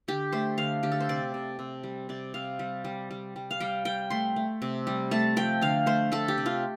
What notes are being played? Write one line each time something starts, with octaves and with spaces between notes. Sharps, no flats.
D3 G4
A3 C5
D3 F5
D3 G4
A4
C5
C3 D5
C3
C3
G3
C3 D5
C3 F5
G3
G3
G3
G3
F5
G3 G5
G3 G5
A3 C6
A3
C3
G3
A3 A5
F3 G5
D3 F5
A3 C5
A3 A4
G4
C3
F4